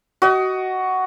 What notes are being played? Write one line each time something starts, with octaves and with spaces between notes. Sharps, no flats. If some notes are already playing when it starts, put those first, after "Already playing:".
F#4 D#5